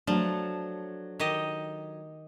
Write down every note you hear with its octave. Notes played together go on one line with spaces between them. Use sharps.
F3 F#3 A3 D4
D#3 G4 D#5